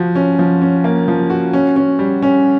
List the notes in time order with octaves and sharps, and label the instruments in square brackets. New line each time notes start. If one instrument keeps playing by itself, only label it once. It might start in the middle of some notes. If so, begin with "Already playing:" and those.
Already playing: [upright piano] F3 F#4
C#4
F3
C#4
A#3
F3
F#4
C#4
C#4
G3
C#4